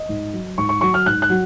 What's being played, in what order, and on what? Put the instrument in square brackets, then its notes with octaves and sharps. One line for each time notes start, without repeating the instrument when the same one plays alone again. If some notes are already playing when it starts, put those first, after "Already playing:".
Already playing: [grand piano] D#5
G#2
F#3
G#2 C#6
C#6
F#3 C#6
F6
G#2 F#6
F#6
F#3